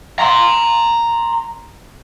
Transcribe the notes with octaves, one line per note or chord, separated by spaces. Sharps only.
A#5 C6